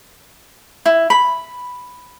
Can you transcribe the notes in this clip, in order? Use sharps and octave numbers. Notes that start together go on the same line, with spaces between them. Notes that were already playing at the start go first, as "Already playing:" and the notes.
E4
B5